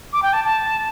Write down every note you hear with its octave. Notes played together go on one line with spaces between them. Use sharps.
D6
G5
A5
A5